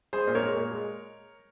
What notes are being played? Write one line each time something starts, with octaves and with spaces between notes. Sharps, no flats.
G#3 G#4 C5
A#2
A#4 C#5
G#3
A#2
G#3